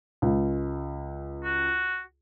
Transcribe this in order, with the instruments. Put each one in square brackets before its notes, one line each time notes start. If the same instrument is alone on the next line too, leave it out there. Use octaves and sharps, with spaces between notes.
[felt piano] C#2
[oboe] F#4